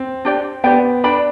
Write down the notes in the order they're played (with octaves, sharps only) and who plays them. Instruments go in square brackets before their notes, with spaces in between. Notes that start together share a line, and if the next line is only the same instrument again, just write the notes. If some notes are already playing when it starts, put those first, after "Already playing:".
Already playing: [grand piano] C4
[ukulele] D4 G4 D5 G5
[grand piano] B3 [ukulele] D4 G4 D5 G5
[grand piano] D4 [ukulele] B4 D5 G5 B5